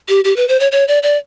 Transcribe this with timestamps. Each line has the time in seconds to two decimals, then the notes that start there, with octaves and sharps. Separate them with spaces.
0.09 G4
0.24 G4
0.37 B4
0.48 C5
0.60 C#5
0.72 C#5
0.88 D5
1.03 D5